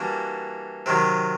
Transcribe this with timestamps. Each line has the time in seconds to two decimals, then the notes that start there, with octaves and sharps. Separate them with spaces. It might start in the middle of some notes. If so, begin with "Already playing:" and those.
Already playing: E3 G3 A#3 D4 F#4
0.86 C3 D#3 F#3